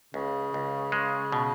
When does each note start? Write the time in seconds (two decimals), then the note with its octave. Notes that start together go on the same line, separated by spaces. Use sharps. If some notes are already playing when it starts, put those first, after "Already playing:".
0.14 C#2 C#3
0.54 C#2
0.92 G#3
1.32 B2